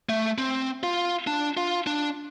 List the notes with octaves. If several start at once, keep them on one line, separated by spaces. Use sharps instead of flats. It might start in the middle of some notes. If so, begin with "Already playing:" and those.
A3
C4
F4
D4
F4
D4